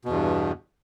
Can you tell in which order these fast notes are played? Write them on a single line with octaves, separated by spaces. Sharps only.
B2 E2 G2